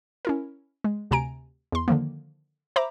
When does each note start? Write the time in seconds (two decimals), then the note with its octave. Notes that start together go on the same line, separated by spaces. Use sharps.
0.25 C#4 E4 A#4
0.84 G#3
1.11 D2 C3 G#5 A#5 D7
1.72 E2 C6
1.88 D3 D#3 F3 A#3
2.76 C5 E5 A#5 B5 D6